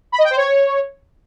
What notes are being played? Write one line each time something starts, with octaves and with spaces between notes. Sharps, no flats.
B5
D#5
G5
C5
C#5